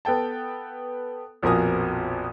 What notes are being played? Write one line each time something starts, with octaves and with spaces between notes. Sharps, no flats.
B3 A4 G5 A5
A#1 F2 B2 A#4 G#5 D#6